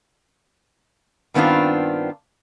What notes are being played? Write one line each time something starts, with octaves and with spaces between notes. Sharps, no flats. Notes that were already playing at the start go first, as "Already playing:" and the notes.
G2 D#3 B3 C4 D4 F4